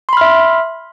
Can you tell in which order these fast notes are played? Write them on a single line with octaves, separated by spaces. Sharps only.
C6 B5 F6 E5